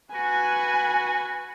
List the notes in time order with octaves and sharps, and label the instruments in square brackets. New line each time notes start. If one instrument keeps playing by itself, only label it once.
[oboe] F#4 [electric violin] B4 G#5